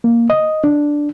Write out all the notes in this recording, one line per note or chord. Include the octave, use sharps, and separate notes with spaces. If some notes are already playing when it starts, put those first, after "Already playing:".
A#3
D#5
D4